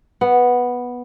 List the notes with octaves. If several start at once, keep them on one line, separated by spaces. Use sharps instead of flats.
B3